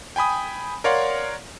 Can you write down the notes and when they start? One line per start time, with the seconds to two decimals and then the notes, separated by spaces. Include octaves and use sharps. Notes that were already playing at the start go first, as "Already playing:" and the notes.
0.16 G5 G#5 B5 D#6
0.84 A#4 C#5 D5 F5 F#5 C6